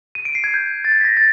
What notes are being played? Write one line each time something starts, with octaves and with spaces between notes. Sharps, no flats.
D#7
D7
C7
G#6
G6
A6
G#6
B6
A#6
A6